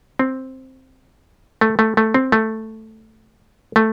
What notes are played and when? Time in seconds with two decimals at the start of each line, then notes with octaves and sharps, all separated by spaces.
0.19 C4
1.61 A3
1.79 A3
1.97 A3
2.14 C4
2.32 A3
3.76 A3